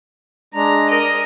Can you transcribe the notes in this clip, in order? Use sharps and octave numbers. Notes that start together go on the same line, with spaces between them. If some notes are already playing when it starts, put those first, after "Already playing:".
G#3 D4 A#5
A#4 D#5